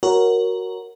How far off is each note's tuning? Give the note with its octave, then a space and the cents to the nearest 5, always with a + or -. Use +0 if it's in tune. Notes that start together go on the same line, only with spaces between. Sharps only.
F#4 +0 A#4 +0 C#5 -5